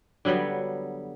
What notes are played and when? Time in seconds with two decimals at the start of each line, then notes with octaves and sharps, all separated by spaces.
0.25 D3 F#3 G3 B3